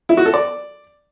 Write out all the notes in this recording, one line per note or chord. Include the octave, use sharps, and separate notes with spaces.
E4
F#4
A4
D5